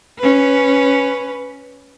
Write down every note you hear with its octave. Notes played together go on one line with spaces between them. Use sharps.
C#4 B4